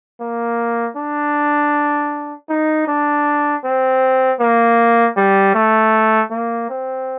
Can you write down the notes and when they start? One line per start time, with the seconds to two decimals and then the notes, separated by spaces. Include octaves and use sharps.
0.21 A#3
0.97 D4
2.49 D#4
2.88 D4
3.64 C4
4.40 A#3
5.16 G3
5.55 A3
6.31 A#3
6.70 C4